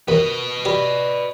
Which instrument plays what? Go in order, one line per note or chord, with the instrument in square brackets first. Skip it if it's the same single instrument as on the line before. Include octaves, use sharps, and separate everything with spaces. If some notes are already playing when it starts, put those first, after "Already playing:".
[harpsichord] D#2 [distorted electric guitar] B4 D#5
[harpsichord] G4 [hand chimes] D5 B5